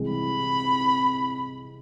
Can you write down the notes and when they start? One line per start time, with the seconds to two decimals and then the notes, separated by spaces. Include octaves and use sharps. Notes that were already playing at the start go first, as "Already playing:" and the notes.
Already playing: C2 C3 E3 G#3
0.11 B5